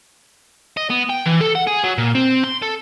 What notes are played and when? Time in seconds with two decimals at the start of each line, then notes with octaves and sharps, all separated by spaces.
0.77 D#5
0.90 B3
1.09 G5
1.26 E3
1.41 A4
1.55 F#5
1.67 G#4
1.84 F#3
1.98 A#2
2.15 C4
2.44 C6
2.62 A4